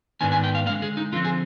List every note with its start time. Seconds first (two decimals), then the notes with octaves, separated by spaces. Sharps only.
0.21 G#2 D#3 B3 D4 G#5
0.32 G#5
0.44 G5
0.55 F5
0.66 B3 F5
0.69 D3 G#3
0.82 G#4
0.97 D#4
1.12 D3 F3 C4 F4
1.24 G#4